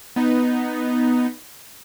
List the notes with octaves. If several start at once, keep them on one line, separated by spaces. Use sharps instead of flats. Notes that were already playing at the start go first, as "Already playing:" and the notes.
B3 D#4